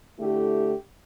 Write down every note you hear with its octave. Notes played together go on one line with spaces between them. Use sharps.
D3 A3 E4 G4